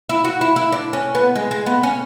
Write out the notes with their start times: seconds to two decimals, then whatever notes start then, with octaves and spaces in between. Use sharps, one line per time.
0.09 E4
0.24 F#4
0.41 E4
0.56 E4
0.72 D4
0.93 C#4
1.15 B3
1.36 G#3
1.51 G#3
1.66 B3
1.83 C#4